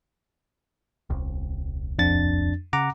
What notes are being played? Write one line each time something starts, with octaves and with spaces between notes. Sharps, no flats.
D#1 C2
F2 D4 A6
C#3 F#5 A#5 D6